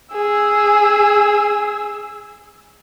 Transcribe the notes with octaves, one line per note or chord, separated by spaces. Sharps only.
G#4 E6